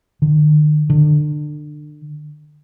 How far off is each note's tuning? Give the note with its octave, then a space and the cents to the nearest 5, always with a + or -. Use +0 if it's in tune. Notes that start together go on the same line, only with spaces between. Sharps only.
D#3 -45
D3 +30